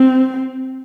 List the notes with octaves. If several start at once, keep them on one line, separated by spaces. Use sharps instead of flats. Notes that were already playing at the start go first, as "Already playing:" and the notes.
Already playing: C4